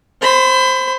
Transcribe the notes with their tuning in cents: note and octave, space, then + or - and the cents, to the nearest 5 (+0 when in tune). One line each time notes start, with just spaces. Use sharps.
C5 +5 B5 +30